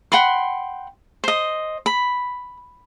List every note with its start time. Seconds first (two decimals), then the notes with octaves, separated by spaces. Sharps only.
0.12 F#5 G5 B5 C6
1.24 C5 D#5
1.86 B5